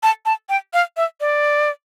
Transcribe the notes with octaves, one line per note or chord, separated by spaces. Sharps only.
A5
A5
G5
F5
E5
D5